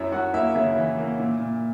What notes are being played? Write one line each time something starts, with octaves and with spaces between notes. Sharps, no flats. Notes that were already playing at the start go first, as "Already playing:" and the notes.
Already playing: F#2 E4 E5
F#2 F#4 F#5
A#3 E4 E5
C#3 E4 E5
E3
A#3
A#2
A#2